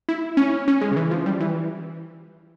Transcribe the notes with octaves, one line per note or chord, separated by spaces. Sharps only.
E4
C#4
C#4
G#3
C#3
E3
F3
G3
E3